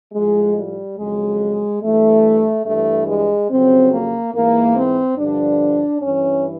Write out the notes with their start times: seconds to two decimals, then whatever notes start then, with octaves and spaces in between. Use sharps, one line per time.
0.13 A2 F3 G#3
0.56 G3
0.97 F2 C#3 F#3 G#3
1.82 G2 E3 A3
2.65 G2 E3 A3
3.07 G#3
3.49 F2 C#3 F#3 C4
3.92 A#3
4.33 G#2 E3 A#3
4.75 C4
5.17 G2 D3 F3 D4
6.01 G2 E3 C#4